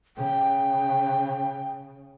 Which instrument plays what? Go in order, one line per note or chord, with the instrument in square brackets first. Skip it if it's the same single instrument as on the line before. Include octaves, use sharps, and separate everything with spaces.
[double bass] C#3 [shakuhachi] G5